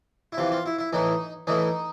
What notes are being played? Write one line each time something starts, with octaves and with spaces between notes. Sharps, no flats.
E4
C3 E3 F4
F4
E4
E4
A2 E3 D#4
A2 E3 D#4